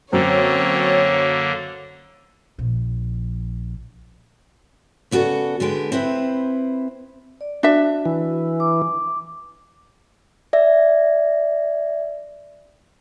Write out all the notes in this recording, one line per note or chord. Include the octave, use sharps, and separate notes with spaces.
F#2 D3 A#3 C4 C#5
A#1 F3
C#3 B3 F#4 G4 A4 D5
D3 G#3 B3 G5
C4 E4 B4 C5
D5
D4 F#4 E5
E3
D6
D5 E5